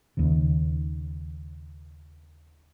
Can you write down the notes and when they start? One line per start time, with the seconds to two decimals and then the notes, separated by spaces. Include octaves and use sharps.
0.17 D#2 C#3